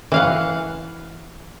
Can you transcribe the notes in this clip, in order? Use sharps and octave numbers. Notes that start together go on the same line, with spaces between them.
E3 F5 F#5